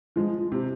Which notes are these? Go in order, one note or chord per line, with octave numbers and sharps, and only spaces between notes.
F3 G#3
C3